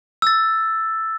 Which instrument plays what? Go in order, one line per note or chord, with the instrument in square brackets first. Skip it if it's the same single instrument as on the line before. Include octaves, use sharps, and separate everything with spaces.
[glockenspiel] E6 A6